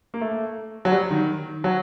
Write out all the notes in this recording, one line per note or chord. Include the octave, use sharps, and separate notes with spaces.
A#3
A3
F#3
G3
D#3
F#3